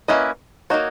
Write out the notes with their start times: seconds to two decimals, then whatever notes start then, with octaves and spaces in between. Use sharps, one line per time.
0.08 A#3 C#4 E4 B4 D#5
0.70 A#3 D#4 F#4 C#5